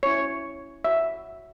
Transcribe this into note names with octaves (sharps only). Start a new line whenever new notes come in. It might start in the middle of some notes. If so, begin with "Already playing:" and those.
C#4 E4 C#5
F#4 C#5 E5